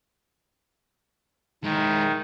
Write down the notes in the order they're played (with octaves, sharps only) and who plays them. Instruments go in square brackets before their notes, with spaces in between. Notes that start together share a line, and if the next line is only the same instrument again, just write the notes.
[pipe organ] D#3 [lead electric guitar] G#3 E4